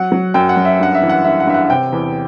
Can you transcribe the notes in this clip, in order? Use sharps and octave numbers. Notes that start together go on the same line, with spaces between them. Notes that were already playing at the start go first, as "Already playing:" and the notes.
Already playing: F#3 F#5
F#3
F#2 G5
F#5
F#2
E5
G2 F#5
E5
E3
F#5
G2 E5
F#5
G2 E5
F#5
C3 G5
E2